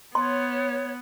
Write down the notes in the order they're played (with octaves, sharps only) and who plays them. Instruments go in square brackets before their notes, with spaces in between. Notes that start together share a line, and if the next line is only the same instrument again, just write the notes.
[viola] B3 [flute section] C#5 [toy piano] C6